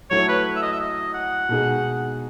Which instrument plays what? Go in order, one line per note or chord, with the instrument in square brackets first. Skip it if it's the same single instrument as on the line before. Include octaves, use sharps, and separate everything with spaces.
[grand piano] F#3 A3 E4 [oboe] C#5
[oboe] B4
E5
D#5
E5
D#5
F#5
[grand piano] B2 G#3 D#4 G#4